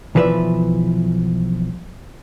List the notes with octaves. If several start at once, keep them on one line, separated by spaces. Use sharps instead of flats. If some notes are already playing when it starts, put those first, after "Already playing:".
B1 E3 F3 B4 D5 E5